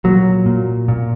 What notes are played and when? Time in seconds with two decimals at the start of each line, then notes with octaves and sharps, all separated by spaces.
0.04 A#2 F#3
0.46 A#2
0.88 A#2